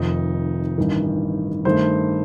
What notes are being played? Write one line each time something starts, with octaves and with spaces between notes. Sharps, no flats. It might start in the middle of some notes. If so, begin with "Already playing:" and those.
Already playing: F1 F2 D#3 D#4
A1 G2 D#3
G2 D#3 A3 C5